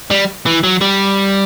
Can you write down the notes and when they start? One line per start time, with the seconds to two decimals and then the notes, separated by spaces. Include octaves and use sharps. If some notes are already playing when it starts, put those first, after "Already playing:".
0.11 G3
0.46 E3
0.63 F#3
0.81 G3